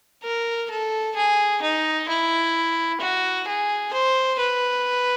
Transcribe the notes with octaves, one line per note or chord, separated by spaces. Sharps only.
A#4
A4
G#4
D#4
E4
F#4
G#4
C5
B4